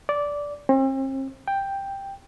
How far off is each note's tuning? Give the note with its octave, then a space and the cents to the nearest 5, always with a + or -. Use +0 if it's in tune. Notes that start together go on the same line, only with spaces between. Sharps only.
D5 -10
C4 +40
G5 +5